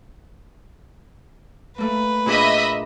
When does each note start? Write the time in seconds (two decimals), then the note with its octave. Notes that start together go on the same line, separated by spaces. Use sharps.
1.78 A3 A#3 B4
2.26 A#2 D4 G#4 D#5 E5 B5